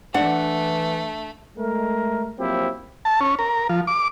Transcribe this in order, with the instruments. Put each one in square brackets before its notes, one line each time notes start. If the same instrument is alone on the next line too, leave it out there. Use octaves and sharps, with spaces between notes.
[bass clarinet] E3 [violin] A3 [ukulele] D4 [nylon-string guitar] F#5
[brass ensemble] G#3 A3 A#4
F3 F#3 A#3 C4 E4 G4
[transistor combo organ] A5
C#4
A#4
F3
D6